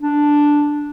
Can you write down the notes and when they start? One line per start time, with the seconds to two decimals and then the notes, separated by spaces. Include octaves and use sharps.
0.02 D4